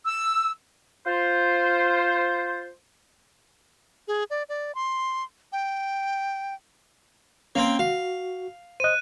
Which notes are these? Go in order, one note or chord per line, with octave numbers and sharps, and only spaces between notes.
E6
F4 C5
G#4
D5
D5
C6
G5
A#3 C4 C#4 G5
F#4 F5
C5 D#5 F#6 D#7